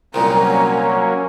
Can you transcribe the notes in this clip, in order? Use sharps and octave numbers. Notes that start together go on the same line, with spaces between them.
C2 A#2 F#3 A#3 C#4 A#5